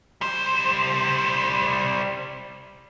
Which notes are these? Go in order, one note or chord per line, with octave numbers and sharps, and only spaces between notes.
G3 C5